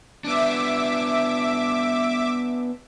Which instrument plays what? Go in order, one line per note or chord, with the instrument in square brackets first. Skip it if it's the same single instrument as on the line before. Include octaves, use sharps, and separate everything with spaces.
[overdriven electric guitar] B3 D4 [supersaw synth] E5 D6